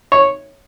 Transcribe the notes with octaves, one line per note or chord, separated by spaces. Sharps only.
C#5